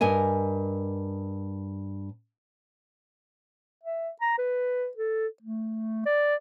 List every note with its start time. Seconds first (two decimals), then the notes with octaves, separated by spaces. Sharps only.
0.01 G2 A#4 D#5 G#5
3.83 E5
4.21 A#5
4.38 B4
4.97 A4
5.42 A3
6.06 D5